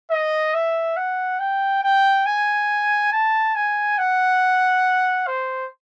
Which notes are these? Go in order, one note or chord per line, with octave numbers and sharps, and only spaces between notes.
D#5
E5
F#5
G5
G5
G#5
A5
G#5
F#5
C5